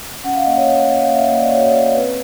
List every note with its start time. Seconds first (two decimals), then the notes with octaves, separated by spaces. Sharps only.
0.24 C#4 F#5
0.35 F5
0.45 A#3 D#5
0.57 C#5
0.67 A#3
0.88 A#3
1.03 F5
1.10 A#3 E5
1.27 A#3 D#5
1.40 D5
1.52 F#4 C#5
1.66 D5
1.73 A#3
1.80 C#5
1.94 C4 B4